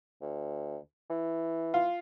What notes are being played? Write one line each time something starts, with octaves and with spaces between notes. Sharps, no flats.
D2
E3
F4